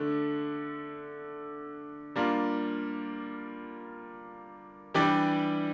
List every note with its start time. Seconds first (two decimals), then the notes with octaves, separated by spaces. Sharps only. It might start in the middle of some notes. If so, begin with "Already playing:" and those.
Already playing: D3 A3 D4
2.16 G3 A#3 D4 F4
4.94 E3 G3 D4 G4 D5